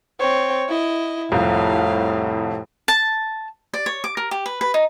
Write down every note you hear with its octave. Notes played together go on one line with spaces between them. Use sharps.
C4 C#5
E4 D#5
C2 F2 A2 F3 F5
A5
D5
C#5
D6
A#4
G4
B4
B4
D#4